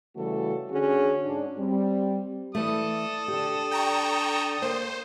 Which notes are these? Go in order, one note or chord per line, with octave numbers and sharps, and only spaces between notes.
C#3 E3 G3 A3 F#4 A4
D3 C#4 F#4 G#4
G#2 C#4 D4
G3 C4
E3 A3 A4 D5 D#6
D3 G4
G5 A#5 C#6
A#3 C5